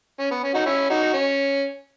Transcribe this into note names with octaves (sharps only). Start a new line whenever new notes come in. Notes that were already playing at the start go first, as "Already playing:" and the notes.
C#4
B3
C#4
D#4 F#4
C#4 E4
D#4 F#4
C#4